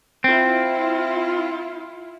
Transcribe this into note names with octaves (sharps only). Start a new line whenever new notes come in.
C4 E4 F4